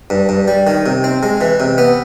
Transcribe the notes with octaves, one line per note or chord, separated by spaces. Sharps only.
G2
G2
G3
D#3
C3
C4
G#3
E3
C3
B3